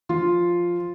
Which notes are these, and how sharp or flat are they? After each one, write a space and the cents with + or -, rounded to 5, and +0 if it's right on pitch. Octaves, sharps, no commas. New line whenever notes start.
F3 +0 F4 +0